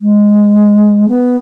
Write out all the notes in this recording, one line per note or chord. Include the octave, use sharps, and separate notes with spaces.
G#3
B3